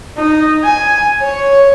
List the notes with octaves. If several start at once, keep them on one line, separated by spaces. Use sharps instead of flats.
D#4
G#5
C#5